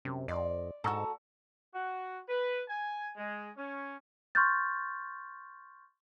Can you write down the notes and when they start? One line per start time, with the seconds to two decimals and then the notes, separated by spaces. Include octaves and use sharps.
0.05 F#2 C3
0.28 F2 D5 D#5 C6
0.84 G#2 F#4 A4 A#5 C#6 E6
1.74 F#4
2.28 B4
2.69 G#5
3.16 G#3
3.56 C#4
4.35 C6 C#6 F6 G6 A6